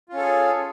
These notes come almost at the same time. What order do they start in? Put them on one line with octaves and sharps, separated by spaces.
F4 C#4 A4 G#4